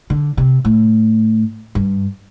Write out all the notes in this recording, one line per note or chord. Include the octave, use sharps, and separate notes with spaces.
D3
C3
A2
G2